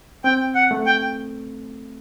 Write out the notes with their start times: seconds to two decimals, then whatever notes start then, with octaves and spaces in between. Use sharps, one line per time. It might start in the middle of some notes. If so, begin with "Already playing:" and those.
0.24 C4 G5
0.55 F#5
0.71 A3
0.86 G5